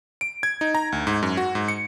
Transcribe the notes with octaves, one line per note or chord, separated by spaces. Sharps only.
D7
G#6
D#4
A#5
D2
G#2
F#2
F#4
G#2
C#7